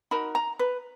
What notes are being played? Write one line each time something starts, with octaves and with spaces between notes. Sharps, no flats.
D#4 F#4 A#4 B5
A#5
B4